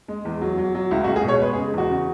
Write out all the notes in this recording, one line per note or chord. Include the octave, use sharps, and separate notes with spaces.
G#3
E2
F#3
F#3
F#3
C#2 E4
F#4
C#2
G#4
B2 C#5
G#3 B4
G#4
C#3
E2 F#4
C#3